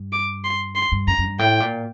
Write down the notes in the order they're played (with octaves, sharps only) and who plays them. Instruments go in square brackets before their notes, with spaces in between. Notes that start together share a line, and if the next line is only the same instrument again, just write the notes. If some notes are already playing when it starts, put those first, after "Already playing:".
Already playing: [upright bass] G2
[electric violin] D6
C6
C6
[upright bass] G2
[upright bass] F#2 [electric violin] A#5
[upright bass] F#2
G2
[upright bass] A2 [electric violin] G5
[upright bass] A#2